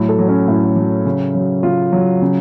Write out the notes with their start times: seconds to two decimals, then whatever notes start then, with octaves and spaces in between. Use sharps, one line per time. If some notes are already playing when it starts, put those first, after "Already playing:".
Already playing: A2 F#3
0.09 A4
0.19 F#3
0.28 C#4
0.48 A2
0.76 F#3
1.06 C#3
1.35 F#3
1.63 C#3 F4
1.92 F#3
2.22 C#3